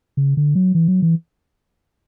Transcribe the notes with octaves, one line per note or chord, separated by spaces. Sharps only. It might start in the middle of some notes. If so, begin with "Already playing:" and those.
C#3
D3
F#3
E3
F#3
E3